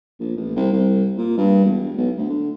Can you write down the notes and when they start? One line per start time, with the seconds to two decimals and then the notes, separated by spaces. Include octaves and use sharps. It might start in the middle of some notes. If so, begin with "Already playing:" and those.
0.20 A#1
0.36 A1
0.56 C2
0.73 C2
1.17 A#2
1.37 G2
1.65 E1
1.97 B1
2.17 D2
2.29 D3